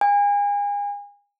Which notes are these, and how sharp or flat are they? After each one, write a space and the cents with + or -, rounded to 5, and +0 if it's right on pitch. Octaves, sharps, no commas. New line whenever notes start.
G#5 -35